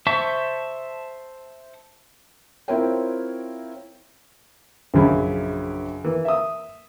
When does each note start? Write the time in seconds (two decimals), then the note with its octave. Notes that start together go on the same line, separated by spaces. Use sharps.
0.07 C5 E5 A5 C#6
2.68 C4 E4 F4 A#4 C#5 G5
4.94 A#1 F#2 C#3 F#3 B5
6.04 E3 A#3
6.25 E5 D#6